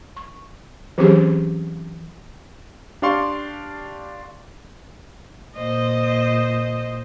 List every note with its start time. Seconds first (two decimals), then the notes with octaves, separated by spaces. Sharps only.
0.17 C#6
0.98 E3 F#3 C4 C#4 G4 G#4
3.02 D4 G4 D5 F5 C6 C#6
5.56 A#2 C5 D#5